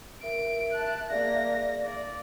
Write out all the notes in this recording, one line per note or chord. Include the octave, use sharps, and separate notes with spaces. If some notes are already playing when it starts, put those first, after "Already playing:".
A#4 E5 D7
A5 F#6
A#3 G#4 D5 F5 A#6
D5